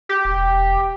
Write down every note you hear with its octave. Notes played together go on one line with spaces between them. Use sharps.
G4
E1